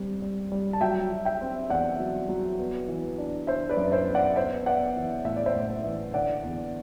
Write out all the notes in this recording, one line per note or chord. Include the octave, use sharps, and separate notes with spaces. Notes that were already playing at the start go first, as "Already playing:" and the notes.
Already playing: G3 C4
G3
G3
A5
F#3 E5 G5
F#3
E5 G5
C4
E2 D5 F#5
F#3
F#3
B3
E3
D4
D4 C5 E5
B4 D5
F#2
C5 E5
B3
D5 F#5
B3 C5 E5
B3 D5 F#5
E3
A2 E5
D5
C5 E5
A2
E3
D3 D5 F#5
E2